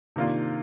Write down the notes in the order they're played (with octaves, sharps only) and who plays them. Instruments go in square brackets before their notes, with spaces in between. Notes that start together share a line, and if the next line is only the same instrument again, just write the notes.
[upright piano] C3 D#3 A#3 D4 F4